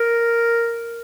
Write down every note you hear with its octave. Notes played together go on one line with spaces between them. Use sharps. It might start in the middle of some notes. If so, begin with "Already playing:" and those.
Already playing: A#4